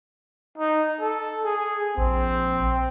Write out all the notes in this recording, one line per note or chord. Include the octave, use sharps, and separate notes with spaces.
D#4
A4
G#4
A#1 C4